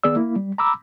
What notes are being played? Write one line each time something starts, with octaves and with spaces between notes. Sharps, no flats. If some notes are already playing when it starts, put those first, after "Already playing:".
D#3 B3 G#4 D5 E6
A#3 E4
G3
A#5 B5 D6 E6